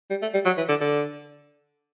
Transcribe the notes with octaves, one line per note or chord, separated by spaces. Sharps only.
G3
A3
G3
F#3
E3
D3
D3